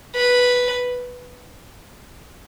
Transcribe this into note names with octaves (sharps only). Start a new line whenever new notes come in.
B4